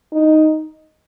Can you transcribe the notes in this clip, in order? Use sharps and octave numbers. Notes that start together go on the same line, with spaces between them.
D#4